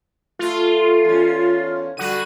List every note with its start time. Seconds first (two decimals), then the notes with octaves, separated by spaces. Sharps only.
0.39 A3 F4
1.05 E2 C#4
1.97 D3 G3 F#4 D#7